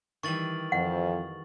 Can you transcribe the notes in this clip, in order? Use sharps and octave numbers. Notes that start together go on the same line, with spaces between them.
D#3 E3 G3 C#6 A6 F#7
F2 F#5